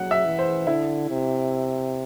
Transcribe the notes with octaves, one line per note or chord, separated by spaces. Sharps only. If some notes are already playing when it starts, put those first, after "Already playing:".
Already playing: F#3 F#5
E5
E3
C5
D3 E4
C3